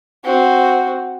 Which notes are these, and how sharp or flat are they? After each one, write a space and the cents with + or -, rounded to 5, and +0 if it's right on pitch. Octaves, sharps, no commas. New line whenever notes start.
C4 +0 F#4 +0